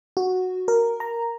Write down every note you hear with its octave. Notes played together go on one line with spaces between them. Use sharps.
F#4
A#4
A#5